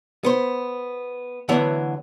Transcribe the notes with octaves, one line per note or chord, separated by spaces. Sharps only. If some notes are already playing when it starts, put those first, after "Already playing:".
B3 C5
D2 D3 E3 F#3 B3